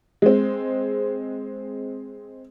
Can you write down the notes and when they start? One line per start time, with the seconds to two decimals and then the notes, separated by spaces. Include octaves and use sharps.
0.22 G#3 C4